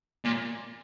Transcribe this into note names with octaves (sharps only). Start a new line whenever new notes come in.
A#2